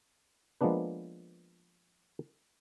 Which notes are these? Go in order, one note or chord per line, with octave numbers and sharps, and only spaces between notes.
F3 G#3 A#3 B3 D4 B4